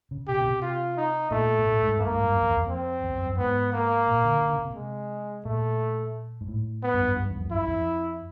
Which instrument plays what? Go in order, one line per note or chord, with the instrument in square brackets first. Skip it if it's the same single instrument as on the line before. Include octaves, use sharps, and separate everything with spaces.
[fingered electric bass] C#3
[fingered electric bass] B2 [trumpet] G4
[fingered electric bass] C#3
C3
[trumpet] F4
D#4
[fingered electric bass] A#2 [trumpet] A3
[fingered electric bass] A#2
A2
G#2
[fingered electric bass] G2 [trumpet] A#3
[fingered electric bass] G#2
G2
F#2
F2
E2
F2
[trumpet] C4
[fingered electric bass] E2
F2
F#2
[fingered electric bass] G#2 [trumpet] B3
[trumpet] A#3
[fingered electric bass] A#2
D3
D3
C#3
C3
[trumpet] G#3
[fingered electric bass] A#2 [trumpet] A3
[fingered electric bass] G#2
A2
[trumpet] B3
[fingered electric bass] G2
G2
G2
E2
F2
[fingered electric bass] F#2 [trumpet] E4
[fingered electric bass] F#2
F2